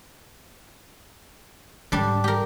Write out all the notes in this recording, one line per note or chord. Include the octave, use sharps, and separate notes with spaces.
G#2 D3 G3 D4
G4 A#4